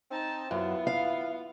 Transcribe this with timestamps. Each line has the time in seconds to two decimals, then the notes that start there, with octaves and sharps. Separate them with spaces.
0.11 C4 D#4 A5
0.51 F#2 B3 E4 F4
0.87 F5